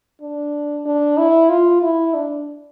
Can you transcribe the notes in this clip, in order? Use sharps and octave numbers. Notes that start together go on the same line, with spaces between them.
D4
D4
E4
F4
E4
D4